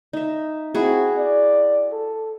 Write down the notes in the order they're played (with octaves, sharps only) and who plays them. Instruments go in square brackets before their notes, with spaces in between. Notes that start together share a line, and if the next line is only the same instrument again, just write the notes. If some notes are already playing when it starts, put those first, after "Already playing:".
[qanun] D#4 E5
[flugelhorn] C4 [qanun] E4 F#4 G#4
[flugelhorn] D5
A4